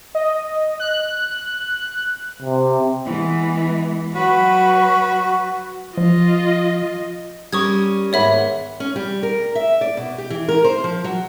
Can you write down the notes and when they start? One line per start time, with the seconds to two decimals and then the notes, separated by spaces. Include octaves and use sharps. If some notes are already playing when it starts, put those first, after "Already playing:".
0.15 D#5
0.80 F#6
2.42 C3
3.05 E3 G#3 B3
4.14 F#3 F#4 B4 C#6
5.97 F3 F4 D#5
7.53 G3 C#4 A#4 C#6 D#6 G#6
8.13 D#2 G#2 B3 C#5 E5 B5
8.80 C#4
8.96 G3
9.23 A#4
9.55 E5
9.81 D5
9.97 B2
10.18 G4
10.30 E3
10.48 A#4
10.64 C5
10.84 F3
11.04 F#3